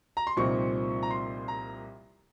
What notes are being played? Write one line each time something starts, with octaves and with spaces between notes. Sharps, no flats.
A#5
C6
C2 A#2 F3 C4 D#4 C#6
A#5
C6
A#5